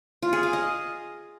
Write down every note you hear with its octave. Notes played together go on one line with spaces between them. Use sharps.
F4
G#4
F5
D#5